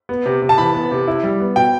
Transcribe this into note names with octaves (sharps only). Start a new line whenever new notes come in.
B3
C3
C3
A5
E3 B5
B3
C3
E4
G3
B3
B2 G5